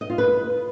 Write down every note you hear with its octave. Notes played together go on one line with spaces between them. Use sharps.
D#5
F4
B4